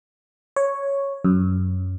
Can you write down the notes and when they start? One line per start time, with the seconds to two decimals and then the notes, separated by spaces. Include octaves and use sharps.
0.56 C#5
1.24 F#2